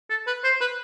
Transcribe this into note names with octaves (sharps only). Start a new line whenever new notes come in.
A4
B4
C5
B4